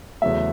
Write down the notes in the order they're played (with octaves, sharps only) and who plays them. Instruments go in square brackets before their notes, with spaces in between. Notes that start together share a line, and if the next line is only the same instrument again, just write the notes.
[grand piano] E2 C#3 F#3 A3 E5